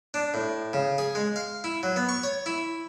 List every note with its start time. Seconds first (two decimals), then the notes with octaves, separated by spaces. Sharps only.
0.14 D4
0.34 A2
0.73 C#3
0.98 G#4
1.15 G#3
1.36 F5
1.64 E4
1.83 F#3
1.96 B3
2.09 C#6
2.23 C#5
2.46 E4